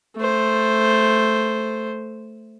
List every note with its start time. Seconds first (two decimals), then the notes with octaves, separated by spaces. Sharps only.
0.17 A3 C5